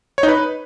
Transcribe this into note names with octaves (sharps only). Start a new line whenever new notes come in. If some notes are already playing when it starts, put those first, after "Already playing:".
C#5
D#4
B4